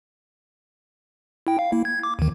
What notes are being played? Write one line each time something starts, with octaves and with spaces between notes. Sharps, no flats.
E4 G5
F5
A#3 E4
G#6
D6
D#2 D#3